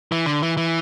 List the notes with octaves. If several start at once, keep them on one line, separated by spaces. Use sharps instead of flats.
E3
D3
E3
E3